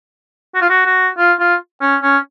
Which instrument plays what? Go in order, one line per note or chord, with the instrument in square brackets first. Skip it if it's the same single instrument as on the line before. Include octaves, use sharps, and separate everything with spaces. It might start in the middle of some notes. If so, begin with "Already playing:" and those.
[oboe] F#4
F4
F#4
F#4
F4
F4
C#4
C#4